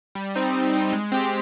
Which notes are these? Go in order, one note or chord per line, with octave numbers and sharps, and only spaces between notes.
G3
C4 D#4
G3
C4 D#4
G#3
C4 G4